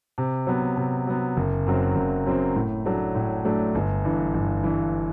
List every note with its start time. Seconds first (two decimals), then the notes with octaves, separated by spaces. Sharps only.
0.18 C3
0.47 F#3 B3
0.77 C3
1.07 F#3 B3
1.37 F#1
1.66 F#2 F#3 C4
1.96 F#1
2.26 F#2 F#3 C4
2.55 A2
2.85 F#3 A3 D4
3.15 A2
3.45 F#3 A3 D4
3.75 G1
4.05 G2 E3
4.34 G1
4.64 G2 E3